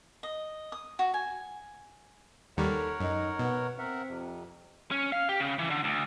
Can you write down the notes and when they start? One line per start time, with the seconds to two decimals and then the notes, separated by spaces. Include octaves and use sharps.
0.23 D#5
0.72 D#6
0.99 F#4
1.14 G#5
2.57 D#2 D#3 G3 A4 A#4 C#5 F#5
3.00 F#2 D#4
3.39 B2 B3
3.78 C4 A#4 E5 F#5
4.08 F2 C3
4.91 C#4
5.12 F5
5.29 G4
5.40 C#3
5.59 E3
5.70 D3
5.84 D2